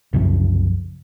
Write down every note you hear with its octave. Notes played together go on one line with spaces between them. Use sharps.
C2 F#2 C#3 F3